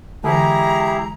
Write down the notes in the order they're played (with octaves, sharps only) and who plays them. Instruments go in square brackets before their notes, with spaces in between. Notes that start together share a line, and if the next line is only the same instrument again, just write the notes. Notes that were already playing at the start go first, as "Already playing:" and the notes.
[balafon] D3 E3 [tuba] G#3 [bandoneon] E4 G4 G#4 [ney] A#5